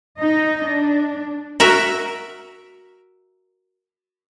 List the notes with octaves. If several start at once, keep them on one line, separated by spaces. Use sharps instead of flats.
D#4 D#5
D4
F#4 A#4 E5